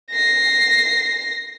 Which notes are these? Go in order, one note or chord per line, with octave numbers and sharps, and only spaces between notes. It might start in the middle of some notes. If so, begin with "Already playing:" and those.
A#6 C7